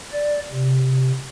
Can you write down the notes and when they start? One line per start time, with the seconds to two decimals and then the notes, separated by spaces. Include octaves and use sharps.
0.13 D5
0.52 C3